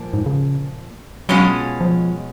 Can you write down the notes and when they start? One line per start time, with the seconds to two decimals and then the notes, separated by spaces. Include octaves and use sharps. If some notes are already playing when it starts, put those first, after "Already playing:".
Already playing: A#2 F3 A#3
0.14 G#2
0.26 C#3
1.29 B2 F#3 G#3 C#4 F4
1.80 F3